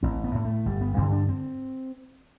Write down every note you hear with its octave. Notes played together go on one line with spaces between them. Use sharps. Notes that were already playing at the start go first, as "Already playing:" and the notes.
A1 C4
B3
A2
A3
G1 G3
B3
G2 D3 C4
D4
C4